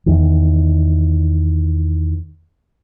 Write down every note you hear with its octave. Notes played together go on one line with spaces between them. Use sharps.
E2 D#3